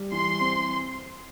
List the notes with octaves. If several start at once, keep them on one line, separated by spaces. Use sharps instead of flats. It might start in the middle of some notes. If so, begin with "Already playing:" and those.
Already playing: G3
E3 C6
C4